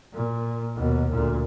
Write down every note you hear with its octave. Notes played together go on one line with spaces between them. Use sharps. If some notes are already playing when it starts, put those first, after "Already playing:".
A#2
D#2 B2
D2 A#2